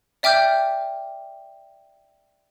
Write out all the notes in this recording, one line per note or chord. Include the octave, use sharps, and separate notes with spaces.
D5 E5 G5 D6 F6 G6